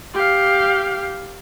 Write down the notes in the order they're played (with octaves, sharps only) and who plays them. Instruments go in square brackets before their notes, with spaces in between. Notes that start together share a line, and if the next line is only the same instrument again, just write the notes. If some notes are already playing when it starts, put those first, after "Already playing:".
[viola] G4 F5